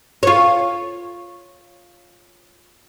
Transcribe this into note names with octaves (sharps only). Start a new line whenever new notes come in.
F4 C#5